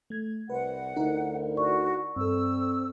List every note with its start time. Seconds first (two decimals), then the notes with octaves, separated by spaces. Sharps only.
0.10 A3 G#6
0.50 C2 B4 C5 F#5
0.96 D2 D#4 E4 A#4
1.56 F#4 D5 C#6
2.16 G2 C4 A4 E6